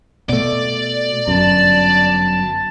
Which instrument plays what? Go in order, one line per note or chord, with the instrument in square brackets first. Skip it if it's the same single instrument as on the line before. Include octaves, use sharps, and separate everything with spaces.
[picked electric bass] B2 A3 [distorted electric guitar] D5
[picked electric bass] G1 F#2 [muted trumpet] A5